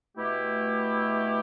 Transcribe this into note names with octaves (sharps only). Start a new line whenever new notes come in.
B2 A3 E4 G4